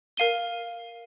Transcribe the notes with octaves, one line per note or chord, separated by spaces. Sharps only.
A#4 F5 D#7 G7